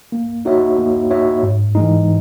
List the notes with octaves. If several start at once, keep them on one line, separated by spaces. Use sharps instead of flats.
A#3
D#4 F#4 C#5 E5
A#3
D#4 F#4 C#5 E5
G#2
E3 G#3 D#4